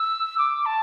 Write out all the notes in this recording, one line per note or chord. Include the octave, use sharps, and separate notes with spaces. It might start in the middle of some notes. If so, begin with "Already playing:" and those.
Already playing: E6
D6
A5